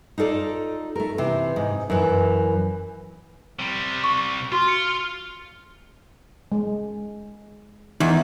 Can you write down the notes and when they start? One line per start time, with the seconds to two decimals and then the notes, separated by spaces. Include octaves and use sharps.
0.18 D#4 F4 A4 D5
0.96 A3 A#4
1.18 C3 E3
1.56 G#2
1.90 F#2 E3
3.60 C3 G3
4.04 C#6
4.52 F4 F#4 C6
4.68 C#7
6.52 G#3
8.00 E2 D#4